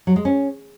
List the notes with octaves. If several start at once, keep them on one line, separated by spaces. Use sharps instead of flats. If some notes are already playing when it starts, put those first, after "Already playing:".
F#3
G#3
C#4